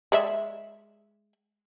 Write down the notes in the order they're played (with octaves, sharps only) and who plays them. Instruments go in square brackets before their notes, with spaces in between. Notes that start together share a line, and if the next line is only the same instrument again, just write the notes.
[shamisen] G#3 D5 E5